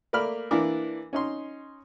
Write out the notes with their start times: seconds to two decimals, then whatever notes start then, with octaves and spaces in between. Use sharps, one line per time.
0.13 A3 A#3 D5 B5 F6
0.51 E3 A#3 D4 D6
1.13 C#4 D#4 C6